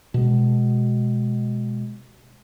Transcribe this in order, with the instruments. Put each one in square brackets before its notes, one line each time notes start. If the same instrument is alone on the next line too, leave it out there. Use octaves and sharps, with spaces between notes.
[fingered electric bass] B2 G#3